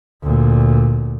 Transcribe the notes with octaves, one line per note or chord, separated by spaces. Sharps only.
D2 A#2